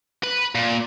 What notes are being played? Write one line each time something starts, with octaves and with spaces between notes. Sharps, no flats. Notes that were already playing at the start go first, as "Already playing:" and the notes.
B4
A#2